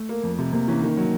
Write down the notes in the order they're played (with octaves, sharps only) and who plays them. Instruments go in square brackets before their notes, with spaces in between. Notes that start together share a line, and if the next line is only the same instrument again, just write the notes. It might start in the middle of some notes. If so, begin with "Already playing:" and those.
Already playing: [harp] A3
[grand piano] A#3
F2
C3
[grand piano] C3 [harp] A#3
[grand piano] E3 [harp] C#4
[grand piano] D#3
F#3